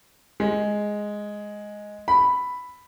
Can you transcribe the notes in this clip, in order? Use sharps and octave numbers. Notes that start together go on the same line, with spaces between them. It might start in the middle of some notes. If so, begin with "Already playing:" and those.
G#3
B5